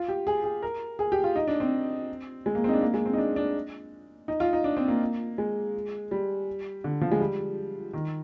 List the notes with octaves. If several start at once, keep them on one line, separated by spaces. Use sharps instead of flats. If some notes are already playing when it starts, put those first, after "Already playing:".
Already playing: F4
G4
G#4
G#4
A#4
G#4
G4
F4
D#4
D4
C4
G#3
A#3
C4
D#4
D4
A#3
G#3
C4
D#4
D4
D4
D#4
F4
D#4
D4
C4
A#3
G#3
G3
D3
F3
G#3
G3
D#3